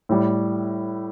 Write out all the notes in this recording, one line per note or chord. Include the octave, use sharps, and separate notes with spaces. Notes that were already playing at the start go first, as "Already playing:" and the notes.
A2 G3